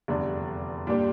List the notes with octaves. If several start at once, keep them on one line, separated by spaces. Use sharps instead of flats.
F1 E2 D3 G3 D4
A#2 G3 D4 G4